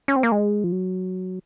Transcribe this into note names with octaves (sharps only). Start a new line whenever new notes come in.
C#4
C4
A#3
G#3
F3
F#3